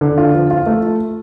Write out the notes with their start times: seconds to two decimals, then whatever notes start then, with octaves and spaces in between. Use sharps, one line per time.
0.01 D3
0.18 F4
0.34 F3
0.51 F4
0.66 A3